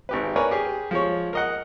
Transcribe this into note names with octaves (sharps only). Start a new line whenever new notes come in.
G#1 G4 B4
A#4 B4 C#5 D5 G#5
G4 G#4
F3 G#3 C#5
A#4 D#5 F#5